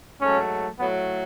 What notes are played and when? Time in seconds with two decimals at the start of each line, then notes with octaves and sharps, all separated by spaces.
0.21 G#2 F#3 A3 C#4
0.79 A2 F#3 A3 B3